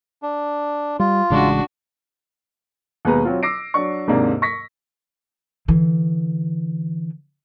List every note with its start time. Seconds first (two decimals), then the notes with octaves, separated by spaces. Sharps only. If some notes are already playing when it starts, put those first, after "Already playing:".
0.22 D4
1.00 G3 F4
1.30 A1 C#3 G#3 D4 F#4
3.05 D#2 B2 G#3 B4 A#5
3.25 F#3 C4 F4
3.43 D6 E6 A#6 C7 D7
3.74 F#3 D4 C#6
4.07 D#2 G#2 C3 A#3 D4
4.42 C#6 A#6 B6
5.68 D3 E3